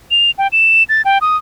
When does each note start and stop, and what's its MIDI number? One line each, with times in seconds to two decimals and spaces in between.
0.11 0.31 101
0.38 0.47 79
0.52 0.83 100
0.89 1.02 93
1.05 1.18 79
1.21 1.37 87